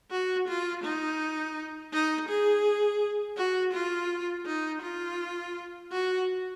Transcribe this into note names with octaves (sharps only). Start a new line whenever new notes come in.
F#4
F4
D#4
D#4
G#4
F#4
F4
D#4
F4
F#4